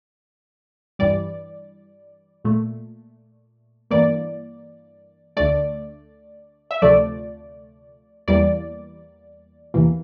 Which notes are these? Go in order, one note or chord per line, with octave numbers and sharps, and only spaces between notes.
G2 E3 G3 D5
A#2 A3
G2 E3 A#3 D5
D2 D3 A3 D5
E5
D2 C3 F3 A3 D5
E2 E3 G3 A#3 D5
E2 C3 E3 A#3